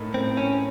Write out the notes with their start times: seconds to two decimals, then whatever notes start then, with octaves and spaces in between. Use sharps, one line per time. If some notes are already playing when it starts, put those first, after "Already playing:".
Already playing: A2 A3 D#4 A#4
0.14 C4
0.37 C#4